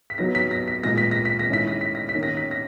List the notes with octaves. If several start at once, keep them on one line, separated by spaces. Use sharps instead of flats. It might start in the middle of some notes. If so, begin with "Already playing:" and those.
B6
F#3 B3 D#4 A#6
B6
A#6
B6
A#2 G#3 B3 A#6
B6
A#6
B6
A#6
D#3 G#3 C#4 E4 B6
A#6
B6
A#6
B6
D#3 A#3 C#4
A#6
B6
A#6